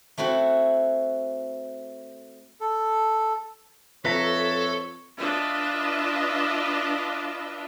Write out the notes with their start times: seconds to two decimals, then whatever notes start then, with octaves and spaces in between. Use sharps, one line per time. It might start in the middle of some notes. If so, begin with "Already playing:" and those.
0.18 A3 C4 E4 F#4
2.61 A4
4.05 F2 A4 B4 C#5 E5 A#5
5.18 D4 F4 B4 D#5 E5